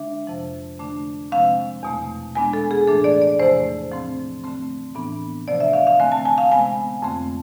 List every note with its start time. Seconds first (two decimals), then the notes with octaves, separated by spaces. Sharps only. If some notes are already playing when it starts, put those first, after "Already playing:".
Already playing: D3 G#3 D4 E5
0.27 F2 C3 F3
0.79 D3 A3 D4
1.31 C3 F3 G#3 C4 F5
1.83 E2 B2 A3
2.35 B2 G#3 B3 D4 G#5
2.53 A4
2.71 G#4
2.87 A2 E3 A3 D4 A4
3.04 D5
3.22 D5
3.39 E2 C3 F3 A3 C5
3.92 A2 F3 A3 C4
4.43 D3 A3 C4
4.95 A2 E3 B3 D4
5.48 C3 F3 A3 D4 D5
5.60 E5
5.73 F5
5.87 F5
5.99 D3 A3 C4 G#5
6.12 A5
6.25 G#5
6.38 F5
6.52 C3 G#3 B3 G#5
7.02 F2 D3 A3 C4